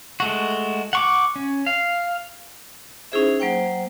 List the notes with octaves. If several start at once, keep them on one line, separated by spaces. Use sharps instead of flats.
G#3 A3 F#4
F#5 C#6 D6
C#4
F5
C#4 D#4 E4 G#4 C5 E5
F#3 A#3 C5 G5